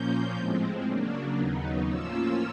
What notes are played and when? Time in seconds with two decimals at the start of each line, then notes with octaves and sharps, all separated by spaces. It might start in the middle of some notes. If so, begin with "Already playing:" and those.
Already playing: A#2 F3 A#3 C#4 G6
0.35 A2 F3 G#3 C4
0.86 C#3 F#3 A#3 D4
1.37 D#2 C#3 F#3 B3 D#4
1.88 A2 F3 A#3 C#4 F4 E6